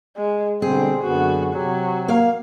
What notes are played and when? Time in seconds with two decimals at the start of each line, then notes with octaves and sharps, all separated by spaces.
0.17 G#3
0.62 B2 D3 G3 C4 G#4
1.04 F#2 D3 B3 F#4
1.54 C3 F#3 G4
2.08 A#3 F5